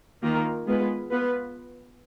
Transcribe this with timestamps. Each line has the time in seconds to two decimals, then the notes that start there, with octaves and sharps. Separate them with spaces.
0.23 D#3 A#3 F4 A#4
0.67 G#3 B3 F4 B4
1.10 B3 F4 B4